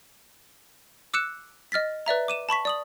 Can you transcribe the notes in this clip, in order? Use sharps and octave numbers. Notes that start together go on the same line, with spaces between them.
D6 E6 F#6 C#7 E7
D#5 F6 A6 B6
B4 D5 E5 A#5
D6 D#7 E7
A5 B5 C#6 B6
D5 D#6 F#7